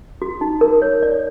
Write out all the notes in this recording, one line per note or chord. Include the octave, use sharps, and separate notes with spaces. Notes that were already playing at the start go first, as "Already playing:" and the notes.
F#4
D#4
A#4
C#5
D5